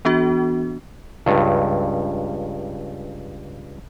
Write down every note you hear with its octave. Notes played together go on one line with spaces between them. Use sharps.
E3 B3 D4 F#4
C#2 G2